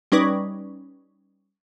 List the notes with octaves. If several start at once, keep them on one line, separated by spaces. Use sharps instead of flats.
G3 C#4 D#4 B4 D5